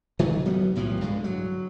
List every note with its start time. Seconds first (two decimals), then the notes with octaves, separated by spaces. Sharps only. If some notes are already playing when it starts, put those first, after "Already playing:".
0.19 D#3 F#3 A3
0.45 D2 F#3 G3 B3
0.75 B1 A2 E3 F3
1.01 G2 D3 F3 G#3
1.24 F#3